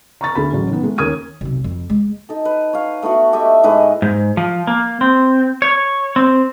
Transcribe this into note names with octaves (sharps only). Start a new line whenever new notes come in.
A#5 C#6 A6
D2 G#4 B5
A1 F#3
D#3 B3
G#3 A3
D#2 C#4 A#4 D#6 G#6 D#7
B1 C3
F2
G#3
D#4 A4
B4
C#5 F5
A3 B3 E4 F#4
G4 A4 D#5 E5
A2 G#3 D#4 B4
G#2
F3
A#3
C4
C#5
C4